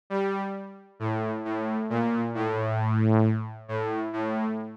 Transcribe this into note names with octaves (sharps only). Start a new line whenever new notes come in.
G3
A2
A2
A#2
A2
A2
A2